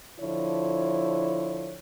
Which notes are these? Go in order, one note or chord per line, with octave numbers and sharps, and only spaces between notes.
D3 F3 E4 C#5